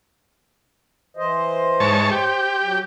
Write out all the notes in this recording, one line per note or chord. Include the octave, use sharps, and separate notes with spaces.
E3 C5 D#5
G#2 C#5 A5
G4 C5
F#3